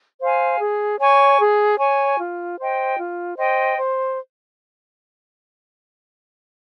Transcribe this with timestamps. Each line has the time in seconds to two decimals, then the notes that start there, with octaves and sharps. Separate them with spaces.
0.20 C5 F5 G#5
0.59 G#4
0.99 C#5 G#5 C#6
1.39 G#4
1.79 C#5 G#5 C#6
2.19 F4
2.58 C5 D#5 G5
2.98 F4
3.38 C5 D#5 G5
3.78 C5